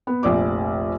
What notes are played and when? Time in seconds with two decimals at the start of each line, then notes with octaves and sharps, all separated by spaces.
0.07 B3
0.23 F1 A#1 D5 D6